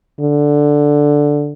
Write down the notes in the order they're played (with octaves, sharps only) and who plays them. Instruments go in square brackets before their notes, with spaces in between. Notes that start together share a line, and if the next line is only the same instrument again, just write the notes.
[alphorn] D3